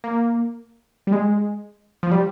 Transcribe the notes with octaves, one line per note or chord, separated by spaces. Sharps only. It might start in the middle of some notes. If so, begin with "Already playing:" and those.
A#3
G3
G#3
F3
G3